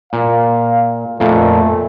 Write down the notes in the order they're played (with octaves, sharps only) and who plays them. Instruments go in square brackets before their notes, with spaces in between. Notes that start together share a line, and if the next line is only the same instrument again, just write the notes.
[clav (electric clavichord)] A#2 [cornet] F5
[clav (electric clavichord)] F2 A#2 [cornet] A3